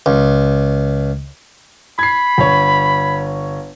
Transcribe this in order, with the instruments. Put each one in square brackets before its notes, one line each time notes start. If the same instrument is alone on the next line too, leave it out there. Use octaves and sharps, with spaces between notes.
[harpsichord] C#2
[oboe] B5 [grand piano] G#6 C7
[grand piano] G1 C#5